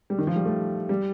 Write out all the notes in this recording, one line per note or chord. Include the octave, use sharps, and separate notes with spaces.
G3
D#3
F3
G3
A3
G3